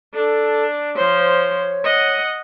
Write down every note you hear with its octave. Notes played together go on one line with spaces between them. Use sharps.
D4 A4
F3 C5 C#5
D#5 F#5